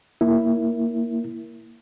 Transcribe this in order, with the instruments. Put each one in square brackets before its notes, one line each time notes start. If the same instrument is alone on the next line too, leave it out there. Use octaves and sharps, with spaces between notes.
[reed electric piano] A#3 E4